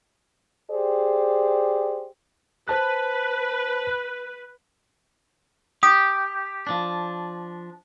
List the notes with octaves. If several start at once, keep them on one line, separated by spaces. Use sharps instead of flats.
G4 G#4 C5 D5
B4 C5 A5 F#6
G4 D#6
F3 D4